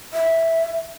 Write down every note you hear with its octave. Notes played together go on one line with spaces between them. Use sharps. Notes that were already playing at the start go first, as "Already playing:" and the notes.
E5